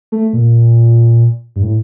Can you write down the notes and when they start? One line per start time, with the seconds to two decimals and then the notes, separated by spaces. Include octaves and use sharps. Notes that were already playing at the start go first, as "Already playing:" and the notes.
0.12 A3
0.33 A#2
1.56 G2
1.63 A2